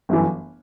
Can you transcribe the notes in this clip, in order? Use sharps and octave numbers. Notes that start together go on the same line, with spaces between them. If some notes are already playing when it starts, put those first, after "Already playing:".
G1 F#2 E3